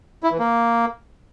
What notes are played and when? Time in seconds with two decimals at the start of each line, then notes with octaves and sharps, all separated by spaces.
0.23 E4
0.31 E3
0.39 A#3